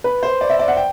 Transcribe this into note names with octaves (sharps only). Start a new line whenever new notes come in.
B4
C5
D5
E5
D5
F#5
G5